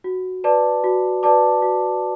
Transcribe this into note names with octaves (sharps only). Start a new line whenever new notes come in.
F#4
B4 D5 A5 D6
F#4
B4 D5 A5 D6
F#4